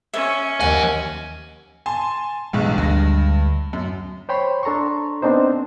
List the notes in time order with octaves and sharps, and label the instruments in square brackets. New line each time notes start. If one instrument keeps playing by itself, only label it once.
[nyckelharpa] C#4 [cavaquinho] E5
[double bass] D#2 [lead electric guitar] F3 G#5 [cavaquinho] F#5
[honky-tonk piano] G#5 A5 C6
[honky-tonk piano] B1 E2 G2 [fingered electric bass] G#3
[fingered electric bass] D2 G#3 [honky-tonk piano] G2 A#6
[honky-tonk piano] F#2
[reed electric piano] C5 C#5 G5 B5 C6
D4 A4 A#5 C6 C#6
B3 C4 D4 D#4 C5